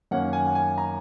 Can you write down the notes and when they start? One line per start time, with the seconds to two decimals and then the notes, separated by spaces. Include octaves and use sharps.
0.11 F#2 D#3 A#3 C#4 F#5
0.33 G#5
0.46 F#5
0.55 G#5
0.78 A#5